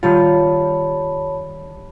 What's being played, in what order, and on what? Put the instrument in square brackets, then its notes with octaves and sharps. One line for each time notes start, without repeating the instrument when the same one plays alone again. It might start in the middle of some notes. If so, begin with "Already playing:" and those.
[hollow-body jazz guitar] D#3 G3 F4 [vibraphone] C#5 A5 B5